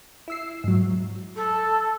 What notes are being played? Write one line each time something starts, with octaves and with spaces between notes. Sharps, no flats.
E4 E6 C7
G#2 F#3
A4